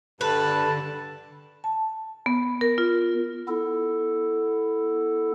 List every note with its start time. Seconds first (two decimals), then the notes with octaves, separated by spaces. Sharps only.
0.21 G2 D3 G3 A4 B4 A5
1.64 A5
2.26 B3
2.61 A#4
2.78 F4
3.48 B3 E4 A4